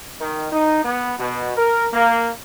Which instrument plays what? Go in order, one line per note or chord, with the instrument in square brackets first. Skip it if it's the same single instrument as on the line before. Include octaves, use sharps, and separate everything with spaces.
[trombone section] D#3
D#4
B3
B2
A#4
A#3